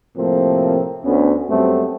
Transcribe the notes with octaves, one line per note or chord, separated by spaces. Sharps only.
A2 C3 F3 A3 A#3 C4
D2 D3 B3 C#4
F#2 G3 A3 B3 C4